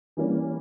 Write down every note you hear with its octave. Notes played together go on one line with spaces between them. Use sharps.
E3 G3 A#3 C#4